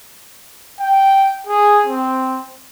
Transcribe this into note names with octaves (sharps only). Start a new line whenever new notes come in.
G5
G#4
C4